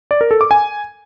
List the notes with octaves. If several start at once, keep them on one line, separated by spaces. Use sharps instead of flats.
D5
A#4
A4
D6
G#5